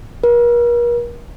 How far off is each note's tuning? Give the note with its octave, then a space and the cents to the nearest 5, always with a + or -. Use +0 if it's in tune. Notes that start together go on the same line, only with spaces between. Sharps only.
A#4 +40